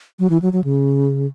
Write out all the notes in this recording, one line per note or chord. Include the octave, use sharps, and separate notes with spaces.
F#3
E3
F#3
F#3
C#3